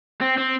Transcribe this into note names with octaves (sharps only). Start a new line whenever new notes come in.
C4
C4